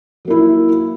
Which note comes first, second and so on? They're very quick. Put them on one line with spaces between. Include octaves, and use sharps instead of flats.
F#3 A#3 E4